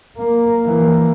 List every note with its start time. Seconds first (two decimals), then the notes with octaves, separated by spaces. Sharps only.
0.17 A#3
0.66 E3 A#3